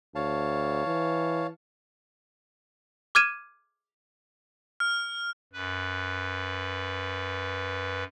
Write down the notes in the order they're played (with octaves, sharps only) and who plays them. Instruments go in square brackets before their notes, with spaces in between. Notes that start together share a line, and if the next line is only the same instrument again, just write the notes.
[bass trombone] D2 [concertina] C#5 F5 A5
[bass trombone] E3
[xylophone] D6 F6 G#6 D#7 E7
[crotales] F6
[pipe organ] F#2 B4